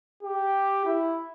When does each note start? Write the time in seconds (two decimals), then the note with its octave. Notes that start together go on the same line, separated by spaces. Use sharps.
0.23 G4
0.85 E4